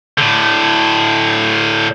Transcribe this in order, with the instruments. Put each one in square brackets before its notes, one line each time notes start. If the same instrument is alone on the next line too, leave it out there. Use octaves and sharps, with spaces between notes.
[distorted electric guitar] A2 D3